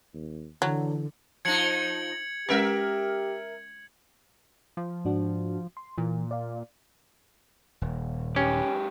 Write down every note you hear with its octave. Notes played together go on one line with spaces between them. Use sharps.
D#2
D3 E3 F#3
F3 D#4 G#6 C#7 F#7
G#3 C#4 G4 A#4 B4 E5
F3
G#2 D4 F#4
C6
A#2 E3
D5 F5
D#1
G#2 C#4 G4